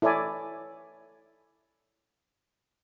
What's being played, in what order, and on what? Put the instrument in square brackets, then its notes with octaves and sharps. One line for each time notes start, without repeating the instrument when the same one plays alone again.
[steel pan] E4 A4 C#5 D5 G#5